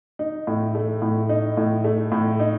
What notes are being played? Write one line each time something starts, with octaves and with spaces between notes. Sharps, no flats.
D#4
A2
A3
A2
D#4
A2
A3
A2
D#4